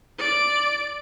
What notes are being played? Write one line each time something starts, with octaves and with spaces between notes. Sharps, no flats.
D5 D7